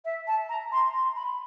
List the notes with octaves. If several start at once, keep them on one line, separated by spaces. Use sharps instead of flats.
E5
A5
A#5
C6
C6
B5